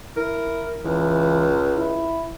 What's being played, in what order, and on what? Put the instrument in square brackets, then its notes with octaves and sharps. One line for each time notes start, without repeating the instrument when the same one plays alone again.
[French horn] E4 [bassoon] A#4
[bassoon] C#2 [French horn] E3
[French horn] E4